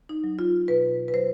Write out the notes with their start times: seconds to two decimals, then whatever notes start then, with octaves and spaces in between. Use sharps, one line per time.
0.09 D#4
0.24 F#3
0.39 F4
0.68 B2 B4
1.08 B4
1.14 F#3 C5